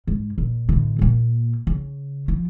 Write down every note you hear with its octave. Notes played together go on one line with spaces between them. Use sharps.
G#2
A#2
A2 D3
A#2 A#3
C#3
F3